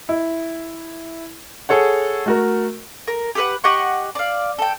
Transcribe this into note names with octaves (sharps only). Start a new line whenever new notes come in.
E4
G#4 A4 C#5 F#5
A3 F#4 A#4
A#4
G4 A4 B4 F#5
G4 D#5 F#5 C#6
D5 F5
A4 G5